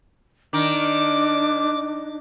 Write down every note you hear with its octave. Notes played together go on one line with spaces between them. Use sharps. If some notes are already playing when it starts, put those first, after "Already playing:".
D#3 D4 D6